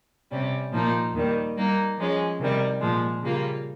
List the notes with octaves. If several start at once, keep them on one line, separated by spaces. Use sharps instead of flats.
C3 G3 C#4
A#2 F3 A#3 D#4
D#2 D#3 G3
G3 A#3 D#4
F3 G#3 C#4
C3 D#3 G3
A#2 F3 G#3
C#3 G3 A#3 F4